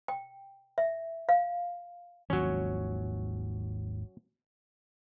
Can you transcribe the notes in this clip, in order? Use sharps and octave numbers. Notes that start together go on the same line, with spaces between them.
G5
E5
F5
G#1 D#2 F3 F#3 C#4